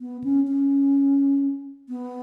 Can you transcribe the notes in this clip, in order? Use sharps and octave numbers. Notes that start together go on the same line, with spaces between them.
B3
C#4
C#4
B3